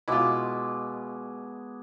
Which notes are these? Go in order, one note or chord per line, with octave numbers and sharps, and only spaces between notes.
B2 G#3 E4 F4 D6